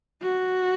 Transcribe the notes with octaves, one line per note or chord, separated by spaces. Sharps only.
F#4